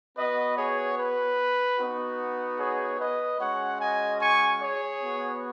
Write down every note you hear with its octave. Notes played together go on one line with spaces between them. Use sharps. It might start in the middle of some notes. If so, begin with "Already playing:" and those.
B3 F#4 B4 D#5
G#4 C#5
B4
B3 D#4 F#4
G#4 C#5
B4 D#5
G#3 C#4 F#4 C#5 F#5
D#5 G#5
G#5 C#6
G#4 C#5
B3 F#4